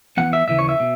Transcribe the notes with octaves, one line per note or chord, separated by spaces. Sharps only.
E2 C#3 E3 B3 F#5
E5
D#2 C#3 E3 E5
C#5
E5
B2